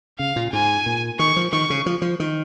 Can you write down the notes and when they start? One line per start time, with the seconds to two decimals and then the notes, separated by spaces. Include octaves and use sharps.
0.19 C#3 F5
0.36 A#2
0.52 G#2 G#5
0.86 A#2
1.19 D#3 C#6
1.36 F3
1.52 D#3 C#6
1.70 C#3
1.86 F3
2.02 F3
2.20 D#3